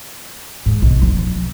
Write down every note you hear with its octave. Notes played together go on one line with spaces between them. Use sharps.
G#2
B1
F3
C#4